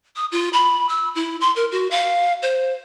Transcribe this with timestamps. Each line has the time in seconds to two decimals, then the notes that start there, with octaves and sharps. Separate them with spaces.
0.16 D#6
0.32 F4
0.53 B5
0.89 E6
1.15 E4
1.41 C6
1.56 A#4
1.71 F#4
1.91 F5
2.42 C5